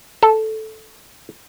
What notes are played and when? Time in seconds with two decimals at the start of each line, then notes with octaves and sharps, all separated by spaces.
0.23 A4